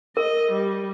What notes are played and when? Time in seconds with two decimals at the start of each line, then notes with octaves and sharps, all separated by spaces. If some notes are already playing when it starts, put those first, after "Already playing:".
0.17 A#4 D#5
0.52 G3